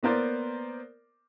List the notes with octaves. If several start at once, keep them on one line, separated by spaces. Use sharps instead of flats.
A#3 B3 A#4 C5 D5